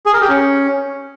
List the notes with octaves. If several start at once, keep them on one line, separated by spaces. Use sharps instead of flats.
G#4
A#4
G4
C#4